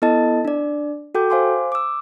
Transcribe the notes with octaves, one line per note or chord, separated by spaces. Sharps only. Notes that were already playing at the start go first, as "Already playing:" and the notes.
B3 E4 A4 D#5 A5 A6
D4 D5
F#4 A4 G5 D6 G6
C5 F5 G#5 C6 D6
D6 E6